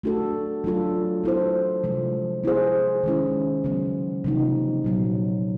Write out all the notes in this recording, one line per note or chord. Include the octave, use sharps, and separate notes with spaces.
A3 D4 F#4 A4
F#3 A3 D4 F4 A4
B3 E4 A4 C5
C3 F3 G#3
B3 E4 G#4 C5
D#3 G#3 C#4 E4
C#3 F#3 B3
C3 F3 A#3 D#4
A#2 F#3 B3